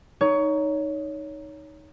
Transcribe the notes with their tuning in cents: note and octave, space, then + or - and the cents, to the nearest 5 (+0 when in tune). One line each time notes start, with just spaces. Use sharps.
D#4 +0 C#5 +20